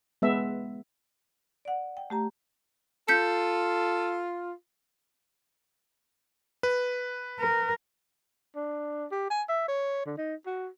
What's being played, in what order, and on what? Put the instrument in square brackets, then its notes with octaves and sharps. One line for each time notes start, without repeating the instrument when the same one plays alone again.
[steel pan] G#3 B3 E5
[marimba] D5 F#5
G5
A3 G4 A#5
[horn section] F4 [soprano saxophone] A4 [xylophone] G6 B6 C#7
[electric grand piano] B4
[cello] A#4
[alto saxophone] D4
G4
G#5
E5
C#5
D3
D#4
F#4